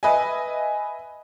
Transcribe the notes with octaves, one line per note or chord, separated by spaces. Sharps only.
B4 D#5 E5 G#5